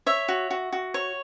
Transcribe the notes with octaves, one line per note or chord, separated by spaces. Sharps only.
C#5 E5
F#4
F#4
F#4
C#5